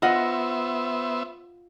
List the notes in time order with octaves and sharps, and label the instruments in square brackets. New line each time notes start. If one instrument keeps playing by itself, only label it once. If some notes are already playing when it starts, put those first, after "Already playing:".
[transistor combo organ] B3 C5 E5 [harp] F4 D#5 F#5